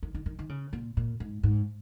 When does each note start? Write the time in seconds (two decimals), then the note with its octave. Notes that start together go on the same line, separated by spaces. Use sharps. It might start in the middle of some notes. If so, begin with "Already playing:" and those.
0.03 D#3
0.15 D#3
0.26 D#3
0.39 D#3
0.49 C#3
0.73 A#2
0.97 A#2
1.20 G#2
1.43 G#2